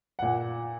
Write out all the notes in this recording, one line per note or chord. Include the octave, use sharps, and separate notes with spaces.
A#2 F#5